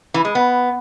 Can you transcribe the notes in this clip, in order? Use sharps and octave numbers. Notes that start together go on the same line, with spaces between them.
E3
G#3
B3